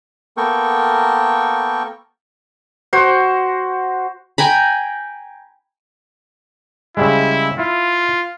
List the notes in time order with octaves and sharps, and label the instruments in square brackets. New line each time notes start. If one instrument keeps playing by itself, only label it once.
[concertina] A#3 B3 A4 A#4 G5 C#6
[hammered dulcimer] F#4 C5
[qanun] G5 G#5 A#5 B5
[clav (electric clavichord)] C#3 G3 G#3 [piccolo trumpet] E4
[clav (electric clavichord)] E4 [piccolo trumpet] F4